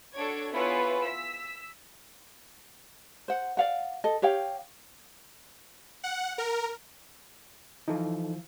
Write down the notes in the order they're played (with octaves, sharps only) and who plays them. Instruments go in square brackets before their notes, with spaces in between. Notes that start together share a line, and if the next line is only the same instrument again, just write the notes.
[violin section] D4 F#4 A4 C#5 G#6 D7
B3 E4 F4 G#4 B4 C#5
E6 B6
[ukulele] C5 F#5
D5 F5 F#5
A4 D#5
G4 C#5 F5 G5
[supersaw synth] F#5
A#4
[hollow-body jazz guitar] E3 F3 [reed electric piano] D#4 A4